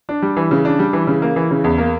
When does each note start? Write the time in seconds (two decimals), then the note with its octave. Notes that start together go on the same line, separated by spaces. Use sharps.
0.09 D4
0.22 G3
0.36 E3
0.51 C#3
0.65 D4
0.79 G3
0.93 E3
1.07 C#3
1.22 A#3
1.36 E3
1.51 C#3
1.64 E2
1.78 A#3